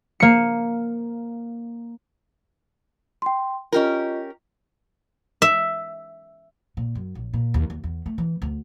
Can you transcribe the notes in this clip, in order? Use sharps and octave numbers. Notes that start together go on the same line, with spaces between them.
A#3 C#7
G5 C6
C#4 F4 G4 A#4 D#5
E5
A#2
F#2
A#1
A#2
D#2
D#2
E2
A3
E3
D2